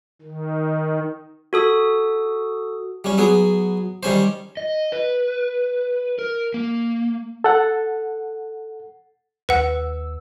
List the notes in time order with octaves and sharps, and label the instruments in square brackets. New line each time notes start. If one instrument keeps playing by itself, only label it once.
[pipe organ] D#3
[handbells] F#4 A4 D#6
[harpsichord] G3 C#4
F#3 B3 G#4
D#3 G3 C#4 C5
[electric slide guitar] D#5
B4
A#4
A#3
[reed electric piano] A4 F#5
[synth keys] D#2 E6 [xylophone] B4 F#5